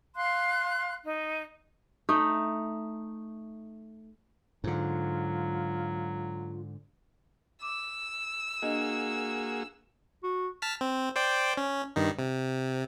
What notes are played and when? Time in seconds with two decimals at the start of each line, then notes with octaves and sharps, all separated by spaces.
0.16 F5 C6 F#6
1.04 D#4
2.09 A3 D#4
4.64 G#2 D3 F#3 F4
7.62 D6 E6
8.62 A#3 D4 F#4 G#4 D#5
10.23 F#4
10.62 A5 F6 B6
10.81 C4
11.16 C5 D5 G5
11.57 C#4
11.96 G2 D#3 D#4
12.19 C3